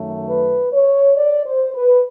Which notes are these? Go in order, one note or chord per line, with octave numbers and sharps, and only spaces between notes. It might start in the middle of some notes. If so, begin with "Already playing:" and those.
Already playing: F#2 D#3 F#3 A3
B4
C#5
D5
C5
B4